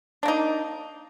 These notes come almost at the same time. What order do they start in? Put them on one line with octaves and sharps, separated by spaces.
D4 A#3 D#4